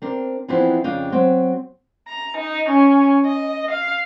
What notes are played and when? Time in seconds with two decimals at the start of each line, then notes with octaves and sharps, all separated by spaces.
0.02 C4 D4 A#4
0.48 E3 F3 B3 C4 D4 E4
0.84 F2 C#3 D4 D#5 F5 G5
1.12 F#3 C4
2.07 A#5
2.39 D#4
2.70 C#4
3.26 D#5
3.71 F5